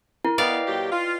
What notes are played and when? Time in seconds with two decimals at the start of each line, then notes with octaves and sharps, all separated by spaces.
0.25 E4 A#4
0.38 B3 B4 D5 D#5 F5 G5
0.66 A#2 F#3 G4
0.90 F4